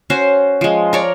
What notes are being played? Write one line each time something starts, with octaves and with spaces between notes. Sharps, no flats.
C#4 F#4 C5
F3 G#3
A#4 C#5 D5